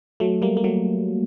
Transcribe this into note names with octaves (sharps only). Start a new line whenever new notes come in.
F#3 A3
G3 A#3
A#3
F#3 A3